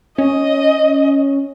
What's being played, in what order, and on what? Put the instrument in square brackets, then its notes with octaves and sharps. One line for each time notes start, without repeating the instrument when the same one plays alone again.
[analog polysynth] C#4 [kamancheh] D#5